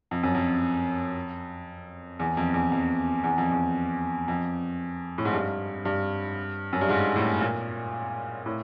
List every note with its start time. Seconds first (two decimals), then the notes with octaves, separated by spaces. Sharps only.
0.11 F2
0.23 F#2
0.35 F2
2.20 E2
2.37 F2
2.54 E2
2.72 F2
3.24 E2
3.38 F2
3.51 E2
4.28 F2
5.18 A2
5.25 G#2
5.33 G2
5.85 G2
6.73 F#2
6.81 G2
6.89 G#2
7.16 A2
7.41 A#2
8.46 A2